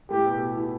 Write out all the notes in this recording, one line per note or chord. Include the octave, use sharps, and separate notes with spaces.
A2 A3 G4
B2 B3
E3 E4